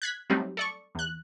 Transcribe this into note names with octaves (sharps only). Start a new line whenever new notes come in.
F#6 G#6 B6
F#3 G3 A3 C4 D#4
A4 D5 C#6
E2 F#6